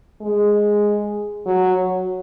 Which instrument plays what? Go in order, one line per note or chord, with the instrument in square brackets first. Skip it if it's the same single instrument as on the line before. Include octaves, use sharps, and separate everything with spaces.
[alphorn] G#3
F#3